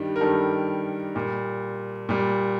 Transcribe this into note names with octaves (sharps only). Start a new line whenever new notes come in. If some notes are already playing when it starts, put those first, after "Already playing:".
Already playing: G2 D#3 G3
A#4
G2 D#3 G3 A4
A#2 G3
A#2 G3